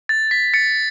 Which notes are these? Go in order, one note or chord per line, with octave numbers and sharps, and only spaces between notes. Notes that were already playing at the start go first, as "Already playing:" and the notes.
A6
B6
A6 C#7